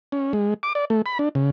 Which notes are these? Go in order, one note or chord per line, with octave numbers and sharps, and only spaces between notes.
C#4
G#3
D6
D5
A3
B5
D4
C#3